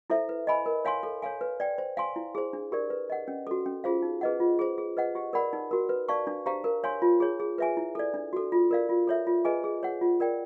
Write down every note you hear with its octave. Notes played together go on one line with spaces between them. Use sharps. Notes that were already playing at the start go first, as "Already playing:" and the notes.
E4 A4 C5 E5
B4
D#5 G#5 B5
A#4
C#5 F5 G#5 C6
A4
C#5 F5 G#5
B4
D5 G5
C5
F5 G#5 C6
E4
G#4 C5
D4
G4 A#4 D5
B4
D#5 F#5
C#4
F#4 A4
C#4
F4 G#4 C5 F5
D#4
G#4 B4 D#5 F#5
F4
G#4 C5
G#4
B4 D#5 F#5
G4
A#4 D5 F#5 B5
D#4
F#4 A#4
B4
D5 F5 A5 C#6
D4
G4 C5 F5 A#5
A#4
C#5 F5 G#5 C6
F4
G#4 C#5
G#4
B4 E5 G#5
E4
A4 D5
D4
F#4 A4
F4
A#4 D5 F5
F4
A4 C#5 E5
F4
G#4 B4 D#5 G#5
G#4
C#5 F#5
F4
A#4 D5 G5